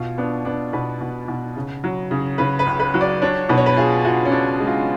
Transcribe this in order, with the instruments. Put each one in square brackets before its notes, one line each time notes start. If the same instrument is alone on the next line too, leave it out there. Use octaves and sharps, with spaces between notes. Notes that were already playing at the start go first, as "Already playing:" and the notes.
Already playing: [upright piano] B2 [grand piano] F4
[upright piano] B3 [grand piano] D4
[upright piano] B3 [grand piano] D4
[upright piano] B2 [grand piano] B4
[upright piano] B2
B2
C#3
F#3
C#3
[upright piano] C#3 [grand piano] B4
[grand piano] B4
[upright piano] C#2
[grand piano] B4
[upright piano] F#3
[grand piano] D5
[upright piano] D4 [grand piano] C#5
[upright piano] B2 [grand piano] B4
[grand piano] C#5
B4
[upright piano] F4 [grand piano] G#4
[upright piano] F4 [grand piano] F#4
[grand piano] C#4
[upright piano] D4
G#3
[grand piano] F4